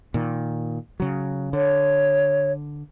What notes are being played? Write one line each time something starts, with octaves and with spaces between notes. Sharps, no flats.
A#2 D#3
C#3 F#3
D3 C#5